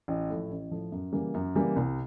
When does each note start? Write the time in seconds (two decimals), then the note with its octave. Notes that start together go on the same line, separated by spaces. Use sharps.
0.08 A1
0.30 A2 F3
0.51 A1
0.71 A2 F3
0.92 F#2
1.12 C#3 E3 G3 A#3
1.34 F#2
1.55 C#3 E3 G3 A#3
1.76 C2